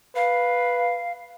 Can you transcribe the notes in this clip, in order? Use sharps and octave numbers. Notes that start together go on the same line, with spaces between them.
B4 F5